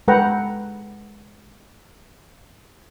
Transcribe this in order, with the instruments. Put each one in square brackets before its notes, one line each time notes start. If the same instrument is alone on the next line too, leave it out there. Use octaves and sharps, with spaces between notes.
[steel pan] G#3 A4 B4 F#5 G5 A#5